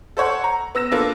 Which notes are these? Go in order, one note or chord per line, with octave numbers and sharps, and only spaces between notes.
A4 C5 C#5 F#5
A#5
B3 E6 A#6 E7
A#3 D4 F4 A4 B4